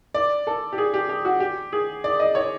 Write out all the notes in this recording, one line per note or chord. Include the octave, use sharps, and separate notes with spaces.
D5
A4
G4
G#4
G4
G4
F#4
G4
G#4
D5
D#5
C#5